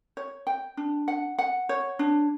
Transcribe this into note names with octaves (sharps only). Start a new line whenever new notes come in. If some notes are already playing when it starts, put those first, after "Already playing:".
C#5
G5
D4
F#5
F#5
C#5
D4